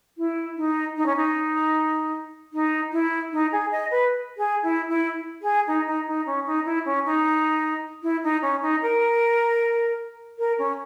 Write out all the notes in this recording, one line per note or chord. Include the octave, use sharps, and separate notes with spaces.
E4
D#4
D#4
C#4
D#4
D#4
E4
D#4
G#4
D#5
B4
G#4
E4
E4
G#4
D#4
D#4
D#4
C#4
D#4
E4
C#4
D#4
E4
D#4
C#4
D#4
A#4
A#4
C#4